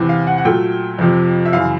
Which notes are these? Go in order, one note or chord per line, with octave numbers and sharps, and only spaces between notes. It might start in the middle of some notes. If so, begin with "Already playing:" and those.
Already playing: E2 C3 E3
F5
F#5
F#5
A#2 F#3 A3 G5
F2 C3 F3
E5
F#2 C#3 E3 F5